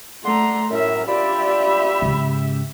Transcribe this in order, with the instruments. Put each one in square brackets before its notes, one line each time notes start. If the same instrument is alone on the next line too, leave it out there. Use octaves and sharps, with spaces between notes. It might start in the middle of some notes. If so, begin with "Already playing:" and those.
[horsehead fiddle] A3 A#5 [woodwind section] D5 F#5 C6
[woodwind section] F#2 A2 [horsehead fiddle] A#4 E5
[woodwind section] D4 F4 D5 [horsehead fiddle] G4 E5 [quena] B5
[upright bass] G#2 C#3